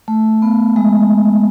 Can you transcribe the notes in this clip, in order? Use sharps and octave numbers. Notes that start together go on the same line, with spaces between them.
A3
B3
G#3